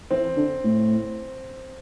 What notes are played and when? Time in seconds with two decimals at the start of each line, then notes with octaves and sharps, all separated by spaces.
0.11 E3 C4
0.36 D3
0.64 A2